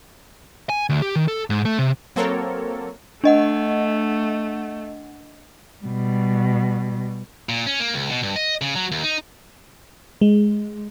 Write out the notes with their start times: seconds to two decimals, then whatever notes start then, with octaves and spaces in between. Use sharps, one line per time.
0.69 G#5
0.89 D2
1.02 G4
1.16 D#3
1.28 A4
1.50 G#2
1.65 A3
1.79 C3
2.16 F#3 A#3 C4 A4 A#4 C#5
3.24 A3 D4 D#5 F#5
5.84 B2 G3
7.49 A#2
7.67 C#4
7.80 A#3
7.94 C#2
8.10 B2
8.23 G2
8.36 D#5
8.61 C#3
8.75 F#3
8.92 D#2
9.03 D#4
10.21 G#3